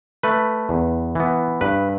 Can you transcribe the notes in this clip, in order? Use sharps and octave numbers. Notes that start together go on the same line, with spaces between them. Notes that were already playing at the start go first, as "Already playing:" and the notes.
A3 B4
E2
E3 B3
G2 B4